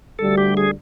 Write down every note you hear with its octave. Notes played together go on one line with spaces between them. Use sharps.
D2 D3 G3 A4
G4
G#4